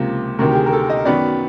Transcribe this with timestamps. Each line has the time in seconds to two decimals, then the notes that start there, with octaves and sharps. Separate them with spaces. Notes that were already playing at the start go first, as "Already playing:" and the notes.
Already playing: C#2 C3 F3 A#3
0.39 D2 C3 D#3 A#4
0.51 G4
0.55 G#4
0.66 A#4
0.73 A4
0.90 D#5
1.05 F#2 D#3 F#3 B3 D5